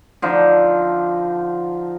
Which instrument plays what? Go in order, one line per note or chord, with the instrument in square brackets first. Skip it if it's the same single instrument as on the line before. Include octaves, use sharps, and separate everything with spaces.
[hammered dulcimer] D3 F3 D#4